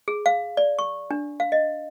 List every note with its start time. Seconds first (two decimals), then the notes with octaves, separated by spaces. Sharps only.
0.08 G#4
0.26 F5
0.57 D5
0.79 C#6
1.11 D4
1.40 F5
1.52 D#5